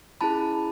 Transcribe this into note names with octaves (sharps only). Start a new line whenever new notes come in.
C#4 E4 G#4 A5 B5